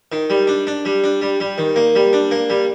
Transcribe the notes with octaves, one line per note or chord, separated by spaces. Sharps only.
D#3
G3
D4
D4
G3
D4
G3
G3
D#3
A#3
G3
D4
A#3
G3